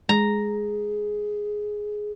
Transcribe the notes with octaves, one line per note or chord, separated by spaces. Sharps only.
G#3 G#4 A#5